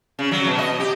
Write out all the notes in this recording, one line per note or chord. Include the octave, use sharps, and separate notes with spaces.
C#3
F#3
B2
D#5
G4